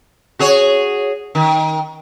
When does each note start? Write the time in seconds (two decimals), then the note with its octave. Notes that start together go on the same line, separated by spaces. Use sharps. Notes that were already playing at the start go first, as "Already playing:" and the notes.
0.39 F#4 G#4 C#5
1.35 D#3